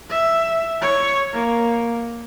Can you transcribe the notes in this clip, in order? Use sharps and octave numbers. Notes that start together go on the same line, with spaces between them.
E5
C#5
A#3